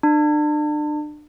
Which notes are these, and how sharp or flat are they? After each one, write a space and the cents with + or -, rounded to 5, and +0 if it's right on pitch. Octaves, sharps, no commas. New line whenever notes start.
D4 +35